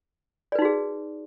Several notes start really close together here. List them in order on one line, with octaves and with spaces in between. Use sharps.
D5 B4 D#4 F#4 G#4